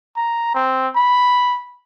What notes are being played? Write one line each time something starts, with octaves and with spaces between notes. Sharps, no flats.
A#5
C4
B5